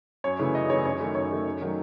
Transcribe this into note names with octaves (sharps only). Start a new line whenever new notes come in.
F#2 C#5
C#3 E3 A3
F#2 D#5
C#3 E3 A3 C#5
F#2 C#5
D#3 A3
F#2 C#5
D#3 A3
F#2
D#3 F#3 A3